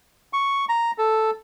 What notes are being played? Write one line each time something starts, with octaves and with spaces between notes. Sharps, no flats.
C#6
A#5
A4